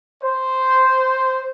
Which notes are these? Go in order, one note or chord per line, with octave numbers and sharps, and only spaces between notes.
C5